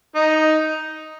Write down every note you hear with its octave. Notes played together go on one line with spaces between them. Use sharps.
D#4